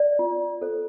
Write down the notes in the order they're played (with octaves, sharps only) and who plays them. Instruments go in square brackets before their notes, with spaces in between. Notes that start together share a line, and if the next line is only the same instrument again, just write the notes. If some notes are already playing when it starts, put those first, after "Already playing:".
Already playing: [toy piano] D5
F4
A4 C5